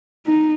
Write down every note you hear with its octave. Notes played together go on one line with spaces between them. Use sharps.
D#4